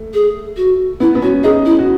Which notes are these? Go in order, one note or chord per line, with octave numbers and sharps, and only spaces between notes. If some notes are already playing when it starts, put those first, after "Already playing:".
Already playing: A3
G#4
F#4
B3 E4
B3
C#4 F#4
D#4 G#4
E4
F#4